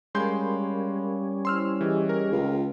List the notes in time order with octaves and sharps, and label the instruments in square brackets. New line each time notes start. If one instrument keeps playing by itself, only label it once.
[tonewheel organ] G3 C#4 [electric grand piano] G#3 C6 G6 [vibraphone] A#4 F5 B5
[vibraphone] E4 C5 [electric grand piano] C6 E6 F6
[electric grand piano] E3 [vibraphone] G4 G#4 D#5
[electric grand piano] A#4
[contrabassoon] C#2 [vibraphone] F4 G5